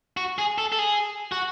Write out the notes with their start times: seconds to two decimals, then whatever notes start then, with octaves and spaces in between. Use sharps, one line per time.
0.17 F#4
0.38 G#4
0.58 A4
0.72 A4
0.79 G#4
1.32 F#4